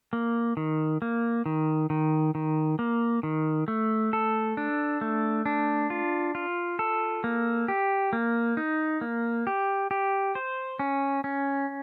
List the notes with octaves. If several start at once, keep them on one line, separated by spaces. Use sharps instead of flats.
A#3
D#3
A#3
D#3
D#3
D#3
A#3
D#3
A3
A4
D4
A3
D4
F4
F4
A4
A#3
G4
A#3
D#4
A#3
G4
G4
C5
C#4
C#4